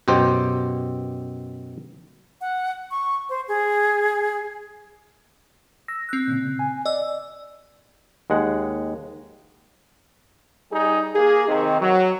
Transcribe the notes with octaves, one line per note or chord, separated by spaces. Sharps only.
F#2 B2 G4 C5 G5
F#5
C#6
C5
G#4
E6 A#6
C4 F#6
A#2 C#3
G#5
D5 D#5 E6
D#2 G#3 F#5
G3 D#4 G#4
A#3 G#4
C3 D#3
F#3